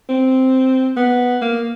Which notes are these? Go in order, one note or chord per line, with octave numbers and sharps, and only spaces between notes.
C4
B3
A#3